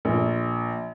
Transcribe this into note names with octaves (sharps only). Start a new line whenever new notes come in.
A#1